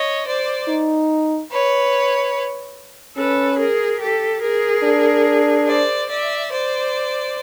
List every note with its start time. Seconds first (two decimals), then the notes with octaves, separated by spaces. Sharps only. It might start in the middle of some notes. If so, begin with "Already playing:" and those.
Already playing: C#5 D#5
0.26 C5 D5
0.68 D#4
1.50 B4 C#5
3.17 C#4 A4 B4
3.59 G#4 A#4
4.00 G4 A4
4.42 G#4 A#4
4.84 D4
5.67 C5 D5
6.08 D5 E5
6.51 C5 D5